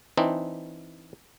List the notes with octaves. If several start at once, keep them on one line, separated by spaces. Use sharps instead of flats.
E3 C4 D4 D#4